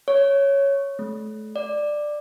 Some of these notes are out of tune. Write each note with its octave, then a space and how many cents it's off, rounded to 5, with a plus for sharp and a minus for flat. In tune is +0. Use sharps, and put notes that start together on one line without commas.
C#5 +0
A3 -35
D5 +10